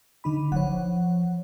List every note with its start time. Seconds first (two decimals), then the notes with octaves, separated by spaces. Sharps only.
0.24 D3 D#4 B5
0.52 F3 C#5 F#5